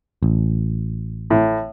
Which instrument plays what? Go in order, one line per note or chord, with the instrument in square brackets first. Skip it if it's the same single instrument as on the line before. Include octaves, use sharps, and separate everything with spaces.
[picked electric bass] A1
[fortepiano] A2